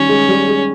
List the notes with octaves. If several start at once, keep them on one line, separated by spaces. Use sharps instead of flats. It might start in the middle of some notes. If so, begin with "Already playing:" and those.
Already playing: D#3 G3 C#4
G#3
G3
G#3